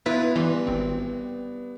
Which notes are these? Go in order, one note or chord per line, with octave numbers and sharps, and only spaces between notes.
B3 E4 F4 B4
G2 E3
G#1 C4